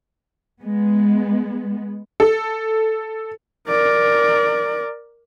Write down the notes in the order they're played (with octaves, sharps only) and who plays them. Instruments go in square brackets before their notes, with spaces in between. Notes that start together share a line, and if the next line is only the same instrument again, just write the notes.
[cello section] G#3 B3
[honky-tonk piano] A4
[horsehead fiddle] A#4 D5